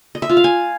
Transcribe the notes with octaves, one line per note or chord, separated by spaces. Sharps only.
D#5
E5
F4
F5
G#5